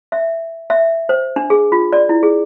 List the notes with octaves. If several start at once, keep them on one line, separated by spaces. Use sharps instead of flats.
E5
E5
C5
D4
G#4
F4
D5
E4
G#4